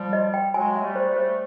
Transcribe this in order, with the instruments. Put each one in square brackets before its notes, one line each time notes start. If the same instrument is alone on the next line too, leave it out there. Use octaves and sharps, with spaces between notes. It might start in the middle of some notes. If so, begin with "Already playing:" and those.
Already playing: [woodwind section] F3 G3
[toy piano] D#5
G5
[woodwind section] F#3 G#3 [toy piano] G#5
[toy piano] E5
[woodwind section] G3 A3
[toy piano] C5
[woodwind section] G3 A3
[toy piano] C5